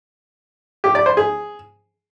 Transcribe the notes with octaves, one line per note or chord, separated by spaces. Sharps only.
G4
D5
C5
G#4